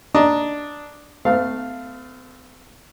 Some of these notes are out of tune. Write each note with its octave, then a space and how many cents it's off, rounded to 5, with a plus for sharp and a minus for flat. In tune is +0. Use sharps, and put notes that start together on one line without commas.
D4 +0 D#5 +0 A#5 +0
A3 +5 C4 -45 F5 +0